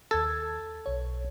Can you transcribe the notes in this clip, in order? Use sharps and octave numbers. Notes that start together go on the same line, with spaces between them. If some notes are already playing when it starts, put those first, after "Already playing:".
D#2 A4 G#6 A6
B1 C#5